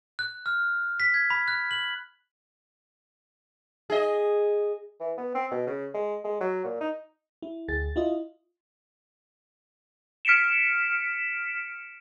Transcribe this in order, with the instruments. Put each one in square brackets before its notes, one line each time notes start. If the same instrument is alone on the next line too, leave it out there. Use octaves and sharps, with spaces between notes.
[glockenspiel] F#6
F6
B6
G#6
B5
F#6
F#7
[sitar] G#4 D#5
[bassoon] E3
B3
C4
B2
C#3
G#3
G#3
F#3
A#2
D#4
[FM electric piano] E4
D2 G#4 A6
E4 F4 D#5
[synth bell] F6 B6 C#7 D7 E7